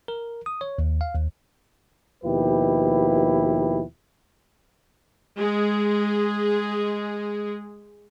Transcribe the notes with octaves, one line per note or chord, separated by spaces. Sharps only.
A#4
D#6
C#5
D#2
F5
D#2
D#2 B2 F3 E4 G4 B4
G#3 G#4